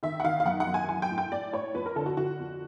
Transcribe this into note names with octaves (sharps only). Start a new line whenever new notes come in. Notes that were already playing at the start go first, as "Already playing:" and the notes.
D#3 E5
F#5
D#3 F5
F5
F#2 F#5
F#5
F#2
G#5
E3 G#5
G5
A2
G5
A2 D5
A2 C#5
F2 B4
A#4
D3 A4
F#4
D3 F#4
F2